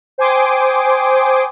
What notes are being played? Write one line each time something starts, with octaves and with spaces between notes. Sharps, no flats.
C5 G5 G#5 C6 D6 D#6